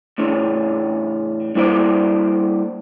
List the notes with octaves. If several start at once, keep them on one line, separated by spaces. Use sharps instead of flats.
A2 C#3 E3 C#4 D4
G3 A#3 E4 A4 C5 D5